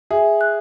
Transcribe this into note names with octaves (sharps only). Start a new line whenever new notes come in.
G#4 E5
F#6